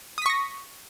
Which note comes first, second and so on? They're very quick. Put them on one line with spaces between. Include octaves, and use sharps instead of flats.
D#6 B6 C#6 A#6